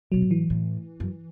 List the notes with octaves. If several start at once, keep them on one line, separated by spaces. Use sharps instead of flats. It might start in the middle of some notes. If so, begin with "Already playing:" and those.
B2 F#3
A2
E3
A2
F#2